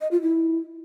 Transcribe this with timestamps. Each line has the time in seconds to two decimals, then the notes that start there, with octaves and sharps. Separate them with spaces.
0.01 D#5
0.11 F4
0.22 E4